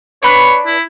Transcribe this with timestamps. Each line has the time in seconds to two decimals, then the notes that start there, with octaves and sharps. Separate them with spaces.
0.23 D4 B4 C#5 F#6
0.66 E4